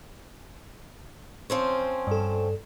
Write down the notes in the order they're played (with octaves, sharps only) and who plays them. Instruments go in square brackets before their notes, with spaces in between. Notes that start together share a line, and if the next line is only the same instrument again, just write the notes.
[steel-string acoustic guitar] F3 C4 C#4
[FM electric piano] G2 A4